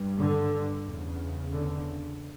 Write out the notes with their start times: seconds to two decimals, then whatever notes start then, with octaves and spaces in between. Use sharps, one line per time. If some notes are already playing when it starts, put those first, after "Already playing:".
Already playing: G2
0.17 D3
0.85 E2 C#3
1.53 D3